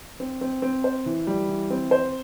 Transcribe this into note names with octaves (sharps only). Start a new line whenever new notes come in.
C4
C4
C4
C5
E3
G3
E3
C4
C5